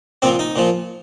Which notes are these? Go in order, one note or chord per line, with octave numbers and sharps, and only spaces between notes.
A#2 F3 C4
D#4
A#2 F3